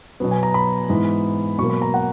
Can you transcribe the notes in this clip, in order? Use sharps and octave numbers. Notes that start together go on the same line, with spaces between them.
B2 F#3 B3
G#5
A#5
B5
G#2 E3 B3
B2 F#3 A#3 C#6
B5
A#5
F#5